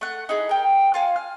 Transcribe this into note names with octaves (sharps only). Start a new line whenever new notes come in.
A3 F#5
D#4 E4 G#4
A#4 G5
F4 F5 G#5
F6